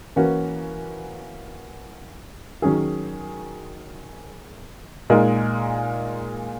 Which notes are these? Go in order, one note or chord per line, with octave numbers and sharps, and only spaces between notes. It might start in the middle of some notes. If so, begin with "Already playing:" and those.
E3 A#3 C#4 F#4
D#3 F#3 C#4 G#4
A#2 G#3 D#4 A#4